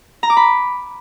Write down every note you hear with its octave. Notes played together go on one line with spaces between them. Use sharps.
A#5
D6
B5